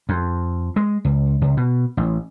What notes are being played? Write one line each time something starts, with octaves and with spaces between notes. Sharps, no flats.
F2
G#3
C#2
C#2
B2
A1